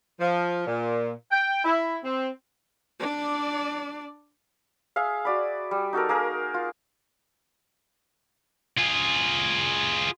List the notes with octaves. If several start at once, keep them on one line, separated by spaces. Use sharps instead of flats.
F3
A#2
G5
E4
C4
D4 D5
G#4 E5 F5
F#4 D5 B5
G3
D#4 F#4 A4 A#4
A#3 G#4 A#4
F4
F4 G#4